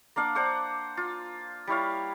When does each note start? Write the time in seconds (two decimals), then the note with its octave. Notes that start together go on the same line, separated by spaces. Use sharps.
0.16 A#3 D4 F5 F#5
0.35 D4 C5 F#5 D6
0.97 F4
1.67 G3 E4 C#5 F5